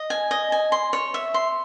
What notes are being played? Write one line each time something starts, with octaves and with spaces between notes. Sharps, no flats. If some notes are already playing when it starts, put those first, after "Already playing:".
Already playing: D#5
G#5
D#5
G#5
C6
C#5
E5
C6